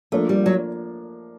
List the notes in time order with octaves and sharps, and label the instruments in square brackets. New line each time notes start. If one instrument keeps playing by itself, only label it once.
[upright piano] F3 A#3 D4 [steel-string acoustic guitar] A3
[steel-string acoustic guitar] G3
F#3